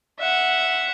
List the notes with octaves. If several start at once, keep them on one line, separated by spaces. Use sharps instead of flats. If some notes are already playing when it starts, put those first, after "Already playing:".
E5 F#5